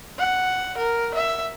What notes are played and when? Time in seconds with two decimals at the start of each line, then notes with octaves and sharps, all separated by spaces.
0.19 F#5
0.78 A#4
1.14 E5